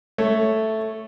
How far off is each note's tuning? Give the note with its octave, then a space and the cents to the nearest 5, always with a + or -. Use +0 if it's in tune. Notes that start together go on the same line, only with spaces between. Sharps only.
A3 +0 C#5 +0